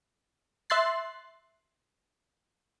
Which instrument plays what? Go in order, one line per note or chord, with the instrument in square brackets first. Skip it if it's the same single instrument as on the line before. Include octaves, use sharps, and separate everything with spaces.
[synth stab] E5 C6 F#6 A6 C7